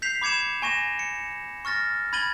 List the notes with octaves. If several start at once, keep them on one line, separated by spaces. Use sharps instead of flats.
G6 B6 C7 F7
B5 D6 G#6 C#7 E7
G#5 C#6 A#6 E7
C#7
C#6 F6 A6 A#6
B5 G#6 A6 D#7 F#7 G7